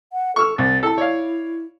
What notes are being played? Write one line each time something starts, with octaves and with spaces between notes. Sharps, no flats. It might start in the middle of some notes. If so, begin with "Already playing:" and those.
F#5
A4 C#6 E6 F6
C2 A6
E4 A4 A5
C#5 D5 F5